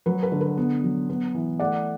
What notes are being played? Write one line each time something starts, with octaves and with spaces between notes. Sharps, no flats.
F#3 B4
B4
D3
B4
B3
F#3
B3
E3
A3 D5 F#5